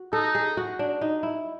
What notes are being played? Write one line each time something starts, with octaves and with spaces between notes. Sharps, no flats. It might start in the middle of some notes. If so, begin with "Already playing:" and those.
Already playing: F#4
D#4 A4
G#4
F#4
D4
D#4
E4